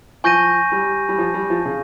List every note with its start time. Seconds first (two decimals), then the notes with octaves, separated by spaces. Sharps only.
0.24 F3 G#5 C#6 G6 A#6 D#7
0.72 G3
1.09 G3
1.18 F3
1.34 G3
1.50 F3
1.65 C#3